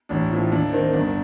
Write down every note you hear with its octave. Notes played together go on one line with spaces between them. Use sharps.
A1 D4
A2 F3
D#2 D4
D#3 C4
G1 D4